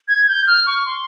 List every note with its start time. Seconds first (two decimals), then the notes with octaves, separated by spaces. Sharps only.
0.08 G#6
0.28 G6
0.47 F6
0.66 C#6
0.86 C6